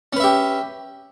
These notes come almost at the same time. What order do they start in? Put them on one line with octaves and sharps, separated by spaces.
C#4 B4 E5 G4